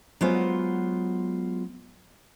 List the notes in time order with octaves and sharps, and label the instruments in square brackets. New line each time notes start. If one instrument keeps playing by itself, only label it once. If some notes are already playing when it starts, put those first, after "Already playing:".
[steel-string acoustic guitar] F#3 G#3 B3 F4 C5 F#5